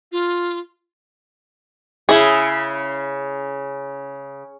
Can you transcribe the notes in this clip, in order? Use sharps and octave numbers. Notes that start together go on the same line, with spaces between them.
F4
C#3 E4 G#4